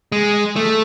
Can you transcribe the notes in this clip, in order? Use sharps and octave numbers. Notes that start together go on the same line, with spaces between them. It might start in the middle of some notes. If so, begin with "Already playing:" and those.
G#3
A3